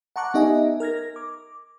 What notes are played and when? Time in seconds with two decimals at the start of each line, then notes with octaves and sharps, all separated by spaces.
0.16 F#5 A5 A#5 C#6 D6 F#6
0.34 B3 D#4 G4 D#5 E5 G#5
0.80 A#4 F6 G#6 A#6
1.16 D6